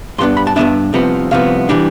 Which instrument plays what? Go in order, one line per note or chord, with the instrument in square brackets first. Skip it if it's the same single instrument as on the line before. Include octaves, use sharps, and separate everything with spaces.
[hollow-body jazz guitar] G2 E3 B3 D4 C6
B5
A5
G2 E3 B3 D4 E5
C2 C3 F3 B3
C2 C3 F3 B3 F5
C3 E3 G3 D4